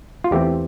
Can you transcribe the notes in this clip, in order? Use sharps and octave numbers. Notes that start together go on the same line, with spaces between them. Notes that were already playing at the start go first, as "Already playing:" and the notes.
F4
E2 E3 A3 C4 G4